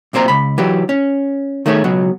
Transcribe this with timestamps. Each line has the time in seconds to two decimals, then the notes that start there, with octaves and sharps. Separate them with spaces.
0.13 B1 A#2 C4 C5 A#5
0.28 C#2 B5
0.58 E3 F#3 G4
0.89 C#4
1.66 D#3 A3 G#4 C#5
1.84 C#2 B2 F#3